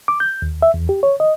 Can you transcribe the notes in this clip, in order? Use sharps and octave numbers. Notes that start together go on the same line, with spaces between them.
D6
G6
D#2
E5
E2
G4
C#5
D#5